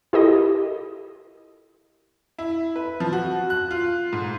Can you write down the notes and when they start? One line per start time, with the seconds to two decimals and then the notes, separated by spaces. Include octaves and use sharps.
0.13 E4 F4 G4 A4 A#4 D#5
2.38 E4
2.76 B4
3.00 F3
3.13 F#4
3.50 F#6
3.71 F4
4.13 G#2